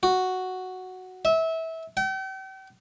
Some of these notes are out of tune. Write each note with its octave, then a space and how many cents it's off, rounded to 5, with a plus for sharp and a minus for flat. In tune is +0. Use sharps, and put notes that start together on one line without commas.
F#4 +0
E5 -25
G5 -40